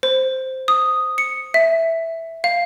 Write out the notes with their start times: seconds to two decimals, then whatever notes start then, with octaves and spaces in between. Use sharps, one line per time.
0.03 C5
0.68 D#6
1.18 C#7
1.54 E5
2.44 F5